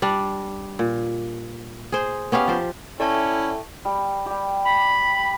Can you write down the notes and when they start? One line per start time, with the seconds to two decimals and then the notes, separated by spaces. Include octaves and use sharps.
0.02 G3 D4
0.79 A#2
1.92 G#4 C5
2.32 B3 C#4 G4 F5
2.48 F3 C5
3.00 C#4 E4 A4 D5 E5 G5 A5 C#6
3.85 G3
4.26 G3 G4
4.65 B5